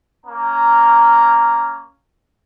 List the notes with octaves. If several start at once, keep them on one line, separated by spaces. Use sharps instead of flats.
A#3 C#4 A#5